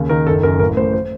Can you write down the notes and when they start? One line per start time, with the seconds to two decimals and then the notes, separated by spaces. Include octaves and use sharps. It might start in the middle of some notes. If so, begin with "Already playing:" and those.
Already playing: D#2 C#3
0.09 D#3 A#4
0.27 F#1 A4
0.43 F#2 A#4
0.59 A1 A#4
0.76 A2 C5
0.93 C5